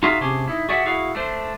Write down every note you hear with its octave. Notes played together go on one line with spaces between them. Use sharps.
D#4 F4 F#4 G#4 E5 F5
C3 C#4 D4 G4 G#4
D#4 E4
F#4 G#4 D5 E5 F#5
E4 F#4 G#4 F5
A3 D4 C5